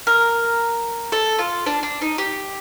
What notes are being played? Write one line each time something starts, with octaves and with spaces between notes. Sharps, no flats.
A#4
A4
F4
D4
D4
D#4
G4